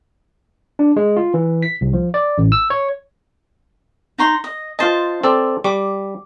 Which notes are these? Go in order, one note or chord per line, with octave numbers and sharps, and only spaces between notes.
D4
G#3
F4
E3
B6
C2
F3
D5
A1
E6
C#5
D#4 A#5 C6
D#5
F4 C5 D#5 A5
C4 A4 D5
G3 D6